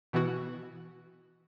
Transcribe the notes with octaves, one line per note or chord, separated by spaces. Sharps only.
B2 E3 B3 E4 F#4